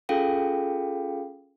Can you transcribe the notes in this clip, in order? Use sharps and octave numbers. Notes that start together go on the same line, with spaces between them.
C#4 F4 G#4 A4 F5 G5